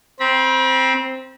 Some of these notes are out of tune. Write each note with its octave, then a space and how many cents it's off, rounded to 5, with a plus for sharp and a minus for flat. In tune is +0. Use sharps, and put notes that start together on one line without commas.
C4 +0 B5 -40